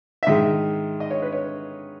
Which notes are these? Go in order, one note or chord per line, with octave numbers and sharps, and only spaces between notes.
E5
G#2 D#3 G#3 D#5
D#5
C#5
B4
C#5